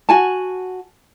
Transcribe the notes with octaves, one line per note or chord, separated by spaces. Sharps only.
F#4 G#5 A5